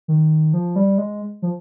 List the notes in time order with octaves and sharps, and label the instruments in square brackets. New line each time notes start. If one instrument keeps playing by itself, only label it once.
[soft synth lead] D#3
F3
G3
G#3
F3